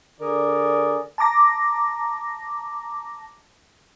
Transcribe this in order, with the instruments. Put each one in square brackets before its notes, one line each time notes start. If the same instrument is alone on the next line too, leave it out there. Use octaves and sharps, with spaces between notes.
[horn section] D3 G#4 A#4 D5
[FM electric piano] A5 A#5 D6 A#6